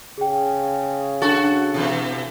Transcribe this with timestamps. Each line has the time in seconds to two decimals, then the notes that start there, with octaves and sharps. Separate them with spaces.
0.18 C#3 G#4 G5
1.22 D4 F#4 A4 C#6 A6
1.74 B2 E3